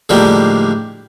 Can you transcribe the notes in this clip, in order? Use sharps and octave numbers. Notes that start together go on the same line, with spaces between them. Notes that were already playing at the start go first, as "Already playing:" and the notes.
A2 D3 F3 G3 G#3 A#3